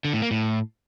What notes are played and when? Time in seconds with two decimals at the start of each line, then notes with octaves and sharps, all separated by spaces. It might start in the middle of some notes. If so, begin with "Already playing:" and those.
0.05 D3
0.13 A2
0.22 A#3
0.31 A2